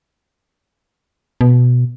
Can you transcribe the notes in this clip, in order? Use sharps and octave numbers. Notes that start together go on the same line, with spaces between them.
B2